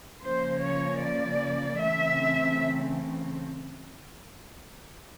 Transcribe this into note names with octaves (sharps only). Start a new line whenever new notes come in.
C#3 F3 A#3 C5
C#5
D5
C#3 E3 A3 C4 E5